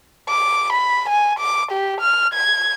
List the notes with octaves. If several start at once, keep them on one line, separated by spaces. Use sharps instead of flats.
D6
B5
G#5
D6
G4
F6
G#6